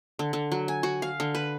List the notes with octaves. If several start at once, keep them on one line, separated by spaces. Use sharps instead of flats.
D3
D3
F#3
G#5
F#4
F5
D3
B4